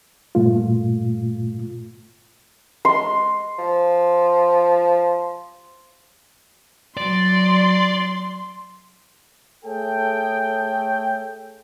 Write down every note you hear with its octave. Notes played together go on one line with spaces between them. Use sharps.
G2 A#2 A3 F4
G#3 C6
F3
F#3 D5 C6
A3 G#4 A4 C#5 G5